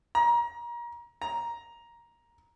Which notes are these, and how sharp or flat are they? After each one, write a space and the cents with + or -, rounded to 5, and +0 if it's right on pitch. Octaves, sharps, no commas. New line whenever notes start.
A#5 +30
A#5 +10